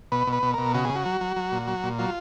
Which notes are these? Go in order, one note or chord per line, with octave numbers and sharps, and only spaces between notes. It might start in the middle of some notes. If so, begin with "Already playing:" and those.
B2 B4
B2
B4
B2
B2 A#4
C#3 F#4
C#3 G#4
F#4
F#3
F#3
F#3
A#2
F#3
A#2
F#3 F4